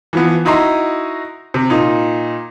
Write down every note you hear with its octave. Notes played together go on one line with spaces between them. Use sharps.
E3 F3 B3
D#4 E4 F#4 D#5 A#5 C6
C3
A#2 D#4